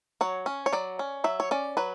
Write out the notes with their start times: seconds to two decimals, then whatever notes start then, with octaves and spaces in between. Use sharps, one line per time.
0.21 F#3 C#5
0.46 C#4
0.66 C#5
0.73 F#3 D5
0.99 C#4
1.24 F#3 E5
1.40 C#5
1.51 C#4 D5
1.77 F#3 B4